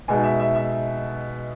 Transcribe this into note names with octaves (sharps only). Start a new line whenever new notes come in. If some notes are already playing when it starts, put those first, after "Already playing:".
B2 G#3 D#4 G#5
E5
E5
E5